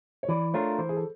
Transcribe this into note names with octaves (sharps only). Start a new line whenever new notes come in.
C#5
E3 D5
A3 D4 F4 A#4 C#5
E3 C5
G#4
A4